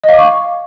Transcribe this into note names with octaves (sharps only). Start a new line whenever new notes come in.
D#5
F5
D6
C#6